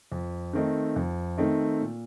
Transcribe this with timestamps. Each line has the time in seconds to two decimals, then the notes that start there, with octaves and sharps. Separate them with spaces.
0.12 F2
0.53 D#3 A3 C4 D#4
0.96 F2
1.38 D#3 A3 C4 D#4
1.80 A#2